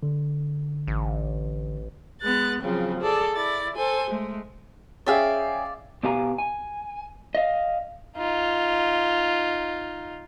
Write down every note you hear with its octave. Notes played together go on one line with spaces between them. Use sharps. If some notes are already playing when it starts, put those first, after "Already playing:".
D3
A1
G#3 B3 F#6 A6
C#3 F3 F#3 C4
G#4 A4 D5
E4 D5 A6
A4 C5 G#5
G#3 A3
C#4 G#4 D5 E5 F5 G5
B2 B3 G4 F5 G#5 A#5
G#5
D#5 F5
D#4 F4